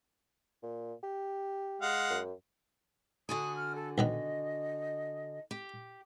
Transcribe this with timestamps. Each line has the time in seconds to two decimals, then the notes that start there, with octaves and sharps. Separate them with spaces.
0.63 A#2
1.03 G4
1.82 G#3 F5 F#5
2.10 F#2
3.29 D3 F#4 G#5 D#6
3.56 F6
3.74 A4
3.98 B1 D#3 B3 D#5
5.51 G4